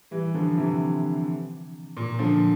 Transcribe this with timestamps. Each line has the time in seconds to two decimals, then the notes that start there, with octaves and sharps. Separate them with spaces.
0.11 E3 G3
0.34 D3 F3
0.58 C3 E3
1.97 A#2
2.19 D3 F3